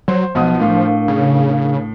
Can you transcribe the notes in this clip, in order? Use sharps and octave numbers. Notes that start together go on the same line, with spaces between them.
F#3 C5
B1 F3 B3 D#6
A2 D4 A#4 F5
C#3